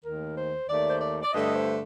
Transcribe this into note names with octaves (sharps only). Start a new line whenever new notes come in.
D#2 D#3 A3 A#4
C5
D#2 D#3 A3 D5
C5
D5
D5
G2 D3 A3 D#5
C5